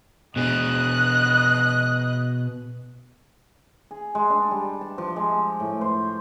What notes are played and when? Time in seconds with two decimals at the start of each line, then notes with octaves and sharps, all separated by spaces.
0.36 B2 G#4 D#5 F#6
3.91 G#4
4.15 G#3
4.30 D4
4.51 G3
4.81 A5
4.98 F3
5.16 G#3
5.60 A2
5.81 C5